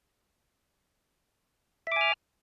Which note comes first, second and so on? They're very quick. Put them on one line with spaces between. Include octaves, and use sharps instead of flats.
E5 D6 G#5 F6